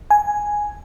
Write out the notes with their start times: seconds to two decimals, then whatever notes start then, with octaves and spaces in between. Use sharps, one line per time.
0.11 G#5